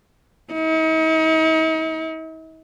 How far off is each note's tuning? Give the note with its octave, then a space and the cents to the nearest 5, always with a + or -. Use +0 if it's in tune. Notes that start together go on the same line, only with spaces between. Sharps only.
D#4 +45